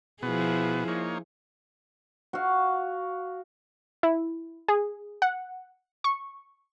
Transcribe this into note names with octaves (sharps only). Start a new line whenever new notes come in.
B2 F3 B3 E4 G#4
A#3 D#4 C#5
F#4 F5
E4
G#4
F#5
C#6